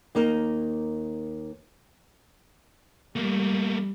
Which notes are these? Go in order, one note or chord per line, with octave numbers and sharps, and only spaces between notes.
D#2 A#3 D#4 A#4
G3 A3 A#3